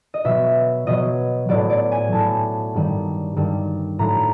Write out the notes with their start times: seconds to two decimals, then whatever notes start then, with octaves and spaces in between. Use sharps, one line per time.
0.14 D#5
0.25 B2 F#3 E5
0.87 B2 F#3 D#5
1.49 A2 F#3 D5
1.70 D5
1.92 G#5
2.12 A2 F#3 A5
2.74 G2 D#3 G3
3.36 G2 D#3 G3
3.99 A2 F#3 A#5